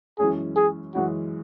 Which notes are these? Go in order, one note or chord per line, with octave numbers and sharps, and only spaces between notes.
F#2 E3 G#3 C#4 E4 G#4
G#4
F#2 E3 G#3 C#4 E4 F#4